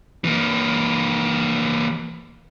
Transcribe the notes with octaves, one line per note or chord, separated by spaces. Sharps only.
E3 A#3